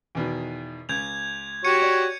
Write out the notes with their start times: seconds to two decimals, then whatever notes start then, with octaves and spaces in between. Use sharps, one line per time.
0.15 E2 B2 D#3
0.89 C#2 G6 G#6 F7
1.64 F#4 G4 C#5 G#6 C#7 D#7
1.82 D5